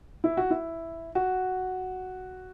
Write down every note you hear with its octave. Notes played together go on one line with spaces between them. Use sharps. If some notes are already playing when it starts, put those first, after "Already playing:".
E4
F#4
E4
F#4